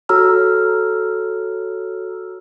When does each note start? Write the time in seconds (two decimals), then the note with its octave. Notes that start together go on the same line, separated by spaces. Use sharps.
0.09 F#4 A4 C#5 A#5 E6 F6